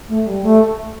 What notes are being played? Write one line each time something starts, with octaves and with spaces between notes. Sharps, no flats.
A3
G3
A3